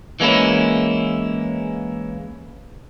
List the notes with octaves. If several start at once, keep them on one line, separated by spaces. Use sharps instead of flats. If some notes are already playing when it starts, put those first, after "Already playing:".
E3 G#3 A#3 C#4 E4